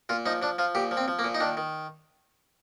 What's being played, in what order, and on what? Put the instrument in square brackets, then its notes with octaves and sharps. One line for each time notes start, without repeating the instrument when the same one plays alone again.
[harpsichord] A#2 F4
F3 D#4
F3 D4
F3 F4
A#2 G4
F3
C4
F3
A#3
A#2
D#4
D#3 D4
D#3